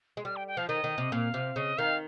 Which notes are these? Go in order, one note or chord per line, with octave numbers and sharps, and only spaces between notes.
G#3
G3 F6
G5
G5
F3 F5
D#3 D#5
D#3
C3
A#2 F5
C3
C#3 D#5
D#3 F5